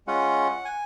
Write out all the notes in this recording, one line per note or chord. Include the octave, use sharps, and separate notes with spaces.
G#3 C#4 F4 F#5
G#5